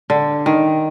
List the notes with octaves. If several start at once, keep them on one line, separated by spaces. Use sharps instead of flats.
D3
D#3